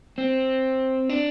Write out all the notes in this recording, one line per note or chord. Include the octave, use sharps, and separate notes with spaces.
C4
D4